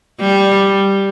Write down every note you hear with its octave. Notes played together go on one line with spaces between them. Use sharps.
G3